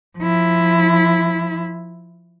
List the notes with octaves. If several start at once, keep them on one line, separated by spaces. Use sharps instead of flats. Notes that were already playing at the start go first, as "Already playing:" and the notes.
F3 E4